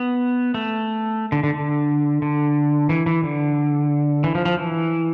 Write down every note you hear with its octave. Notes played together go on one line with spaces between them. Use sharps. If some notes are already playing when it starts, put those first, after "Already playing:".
Already playing: B3
A3
D3
D3
D3
D3
E3
E3
D3
E3
F3
F3
E3